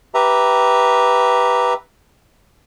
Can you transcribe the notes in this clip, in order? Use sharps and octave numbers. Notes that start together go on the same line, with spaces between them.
G4 B4 E5 A#5